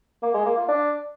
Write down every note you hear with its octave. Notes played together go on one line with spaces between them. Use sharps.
A#3
G#3
A#3
F4
D4